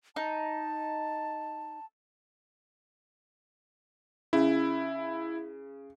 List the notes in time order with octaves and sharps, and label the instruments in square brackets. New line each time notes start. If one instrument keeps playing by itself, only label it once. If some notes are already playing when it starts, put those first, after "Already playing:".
[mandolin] D#4 [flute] A5
[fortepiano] C#3 [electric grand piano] E4